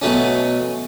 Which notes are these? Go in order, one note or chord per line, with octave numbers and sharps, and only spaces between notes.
B2 F#3 A3 C#4